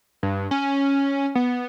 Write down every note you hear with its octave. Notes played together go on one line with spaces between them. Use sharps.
G2
C#4
B3